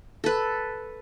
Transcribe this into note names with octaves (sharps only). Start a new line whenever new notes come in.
A4 B4